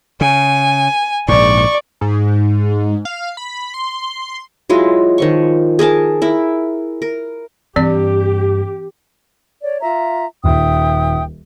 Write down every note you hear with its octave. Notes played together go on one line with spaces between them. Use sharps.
C#3 G#5
A#1 G#2 D5 C#6
G#2
F5
B5
C6
F#3 G#3 E4 F4
D#3 F3 C#6
G#4 A#4 G#5 A5
E4 A#4
A#4
G2 E3 C4 G4 D5
C#5 D5
F4 E5 A#5
D#1 E5 G5 D#6